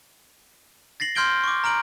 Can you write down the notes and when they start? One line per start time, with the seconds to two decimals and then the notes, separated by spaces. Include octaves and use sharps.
1.00 A6 A#6 C7 F#7
1.15 C6 F6 G6 G#6 D7 G7
1.44 C#6 D6
1.64 A#5 F6 D7 F#7